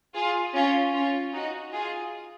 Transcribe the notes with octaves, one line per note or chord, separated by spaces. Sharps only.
F4 G#4
C#4 F4
C#4 F4
D#4 F#4
F4 G#4